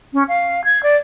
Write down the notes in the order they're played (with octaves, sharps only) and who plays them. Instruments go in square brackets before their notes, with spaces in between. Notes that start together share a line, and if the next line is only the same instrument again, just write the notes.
[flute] C#4
F5
G#6
D5